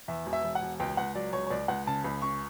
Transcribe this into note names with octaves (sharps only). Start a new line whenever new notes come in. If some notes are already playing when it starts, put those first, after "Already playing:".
E2 E5
E1
E5
E1
F#5
E1
C#2 G5
C#2 F#5
F#3 D5
C#2 C#5
C#5
C#2 D5
C#2 F#5
C#3 A5
C#2 B5
C#3 C#6